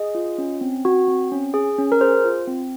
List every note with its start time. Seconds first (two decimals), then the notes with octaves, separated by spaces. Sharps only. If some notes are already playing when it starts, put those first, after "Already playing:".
Already playing: G#4 D#5
0.15 F4
0.38 C#4
0.61 C4
0.85 F#4
1.08 C4
1.32 C#4
1.54 G#4
1.78 C#4
1.92 A#4
2.01 G#4 C5
2.24 F4
2.47 C4